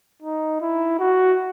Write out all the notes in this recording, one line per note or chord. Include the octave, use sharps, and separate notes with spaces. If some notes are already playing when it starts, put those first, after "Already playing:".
D#4
E4
F#4